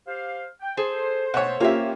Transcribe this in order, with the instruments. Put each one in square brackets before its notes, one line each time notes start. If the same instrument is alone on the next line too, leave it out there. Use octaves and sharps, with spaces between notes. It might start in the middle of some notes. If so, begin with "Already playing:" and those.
[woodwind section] G4 C5 F5
G5
[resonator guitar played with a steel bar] G#4 A4 [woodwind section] C5
[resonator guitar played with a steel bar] B2 A3 [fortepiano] C#5 F#5
[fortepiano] A#3 C#4 [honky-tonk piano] F4 G4 [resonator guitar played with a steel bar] C#5 E5